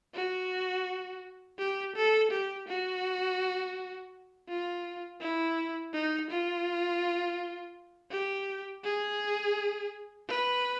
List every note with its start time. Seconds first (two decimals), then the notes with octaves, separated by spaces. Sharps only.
0.15 F#4
1.59 G4
1.96 A4
2.31 G4
2.68 F#4
4.48 F4
5.21 E4
5.93 D#4
6.31 F4
8.11 G4
8.84 G#4
10.28 B4